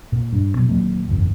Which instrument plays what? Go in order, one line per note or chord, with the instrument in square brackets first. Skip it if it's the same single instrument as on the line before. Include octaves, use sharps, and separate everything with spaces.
[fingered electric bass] A#2
G2
B2 F#3
D#1 D2 F#3 A#3
F#1 E2 G#2